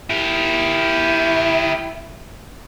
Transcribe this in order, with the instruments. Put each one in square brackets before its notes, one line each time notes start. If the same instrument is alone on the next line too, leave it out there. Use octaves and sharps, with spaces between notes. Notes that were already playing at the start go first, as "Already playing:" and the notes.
[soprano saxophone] E4 [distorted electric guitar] G4 A#4